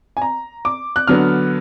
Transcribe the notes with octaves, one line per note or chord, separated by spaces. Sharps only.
G#5
A#5
D6
F#6
D3 F#3 B3 F6